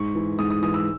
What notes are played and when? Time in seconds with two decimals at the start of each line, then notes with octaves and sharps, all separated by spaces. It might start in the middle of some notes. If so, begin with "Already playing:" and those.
Already playing: G#2 C#6
0.15 E3
0.39 G#2 D#6
0.50 D#6
0.62 E3 D#6
0.74 E6